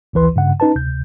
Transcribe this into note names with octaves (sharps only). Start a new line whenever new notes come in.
A1 D2 E3 B4 C6
G2 C#3 F#5
C#4 D#4 B4 A5
D2 C3 G6